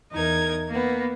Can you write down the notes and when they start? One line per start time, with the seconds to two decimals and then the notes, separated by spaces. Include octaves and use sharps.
0.12 E2 D#4 A#4 G#6
0.68 A#3 B3